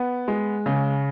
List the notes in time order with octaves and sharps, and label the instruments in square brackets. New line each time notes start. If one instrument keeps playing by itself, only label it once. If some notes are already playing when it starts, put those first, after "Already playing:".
Already playing: [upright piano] B3
G#3
C#3